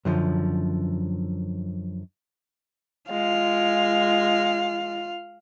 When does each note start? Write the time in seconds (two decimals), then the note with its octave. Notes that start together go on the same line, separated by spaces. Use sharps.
0.05 F#2 D3 F3
3.11 G#3 F4 F5